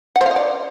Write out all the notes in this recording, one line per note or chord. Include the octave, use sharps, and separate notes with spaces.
F#5
C5
F5
D#5
D5